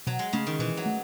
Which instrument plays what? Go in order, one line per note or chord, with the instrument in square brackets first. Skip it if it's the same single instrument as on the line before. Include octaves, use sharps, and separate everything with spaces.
[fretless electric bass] B2 [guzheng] F#3
[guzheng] G#3
[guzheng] C#3 [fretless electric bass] A3 C#4
[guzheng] D#3
[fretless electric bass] B2 [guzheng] E3
[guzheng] F#3
[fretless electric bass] A3